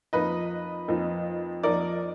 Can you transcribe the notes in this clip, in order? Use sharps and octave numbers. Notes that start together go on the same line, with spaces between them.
F2 F3 A#3 D#4 B4 D#5
F2 F3 A#3 D#4
F2 F3 A#3 D#4 A#4 D5